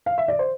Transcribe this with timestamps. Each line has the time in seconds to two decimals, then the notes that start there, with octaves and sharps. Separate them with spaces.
0.06 F5
0.18 E5
0.28 D5
0.39 C5